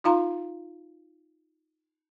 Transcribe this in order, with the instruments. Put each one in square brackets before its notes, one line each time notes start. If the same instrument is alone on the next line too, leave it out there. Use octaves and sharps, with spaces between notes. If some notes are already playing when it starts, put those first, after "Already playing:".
[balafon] D#4 F4 F5 A#5 C6